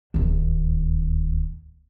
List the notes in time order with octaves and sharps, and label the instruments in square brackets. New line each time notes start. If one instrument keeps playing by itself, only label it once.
[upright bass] D1 D#2